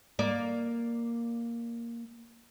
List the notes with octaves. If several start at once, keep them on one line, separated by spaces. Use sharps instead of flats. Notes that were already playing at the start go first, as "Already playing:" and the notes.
A#3 D5